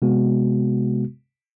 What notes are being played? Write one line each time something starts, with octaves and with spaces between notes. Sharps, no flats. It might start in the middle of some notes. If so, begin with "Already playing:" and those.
C3 G#3 B3 F#4